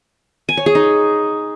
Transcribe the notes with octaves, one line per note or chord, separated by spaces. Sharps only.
G#5
C#5
G#4
D#4